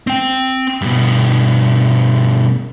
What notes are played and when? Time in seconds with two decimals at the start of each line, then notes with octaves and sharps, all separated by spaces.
0.07 C4 G5
0.82 G2 B2